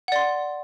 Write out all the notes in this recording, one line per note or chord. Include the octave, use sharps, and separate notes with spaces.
D5 F#5 C6